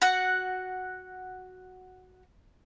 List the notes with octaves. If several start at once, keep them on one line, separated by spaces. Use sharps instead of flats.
F#4 F#5